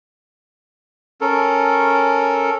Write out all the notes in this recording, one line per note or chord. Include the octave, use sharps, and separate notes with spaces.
C#4 A4 A#4